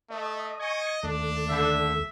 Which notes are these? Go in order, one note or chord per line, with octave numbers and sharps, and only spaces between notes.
A3 D#5
D#5 G#5 C#6
D#2 A3 D4
D3 E5